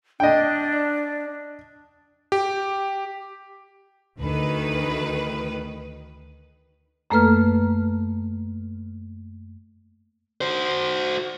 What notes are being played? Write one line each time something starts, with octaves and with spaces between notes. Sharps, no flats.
D4 D#5 G5
G4
D2 D#3 B4
F#2 A3 A#3 A4 B4 F6
F#4 C5